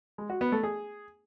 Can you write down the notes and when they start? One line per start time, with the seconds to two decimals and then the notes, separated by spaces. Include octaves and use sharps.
0.18 G#3
0.30 F#4
0.41 B3
0.52 A3
0.63 G#4